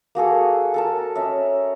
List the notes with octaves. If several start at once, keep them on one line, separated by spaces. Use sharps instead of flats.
A#3 F#4 G#4 A4
A4 A#4 A5
C#4 D#5 E5